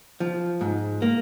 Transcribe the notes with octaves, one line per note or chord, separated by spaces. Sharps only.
F3
G#2
A#3